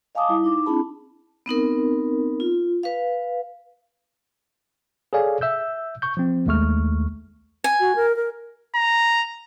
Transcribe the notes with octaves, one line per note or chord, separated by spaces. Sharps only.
D#5 F5 G#5 A5 D6 D#6
G3 E4
D#4 D6
C4 D4 E4 G#4 A5 B5
B3 C4 D#4 A#4
F4
B4 F5
G#4 A4 C#5 D5 F5 G#5
E5 E6 G6
C#6 G6
F3 C4
A#1 D#2 G#3 A3 C#6 F6
G#5
F#4
A#4
A#4
A#5